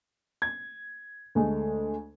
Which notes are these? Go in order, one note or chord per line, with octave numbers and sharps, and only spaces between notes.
G#6
D2 G#3 A3